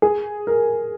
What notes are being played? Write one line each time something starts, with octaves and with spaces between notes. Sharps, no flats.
G#4
A#4